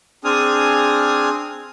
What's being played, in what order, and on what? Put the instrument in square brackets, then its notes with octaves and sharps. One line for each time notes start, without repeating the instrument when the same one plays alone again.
[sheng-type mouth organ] C4 D4 G#4 G#5 D#6 F6